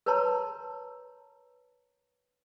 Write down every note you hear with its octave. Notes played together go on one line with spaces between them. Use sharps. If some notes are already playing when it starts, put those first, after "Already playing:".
A#4 B4 C#5 A5 A#5 C6